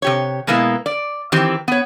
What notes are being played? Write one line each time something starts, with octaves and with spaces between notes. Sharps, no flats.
C3 G4 C#5
B2 G#3 A#3 B3 E4
D5
D#3 E3 C4 G4
B3 C#5